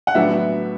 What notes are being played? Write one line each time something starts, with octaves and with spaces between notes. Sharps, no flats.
F#5
A2 F#3 B3 D4 E5